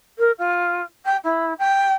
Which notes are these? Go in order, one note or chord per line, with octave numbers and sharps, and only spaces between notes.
A#4
F4
G5
E4
G5